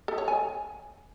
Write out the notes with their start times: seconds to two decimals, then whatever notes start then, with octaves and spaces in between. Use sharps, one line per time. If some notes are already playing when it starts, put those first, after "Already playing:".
0.08 A4
0.18 C#5
0.28 G#5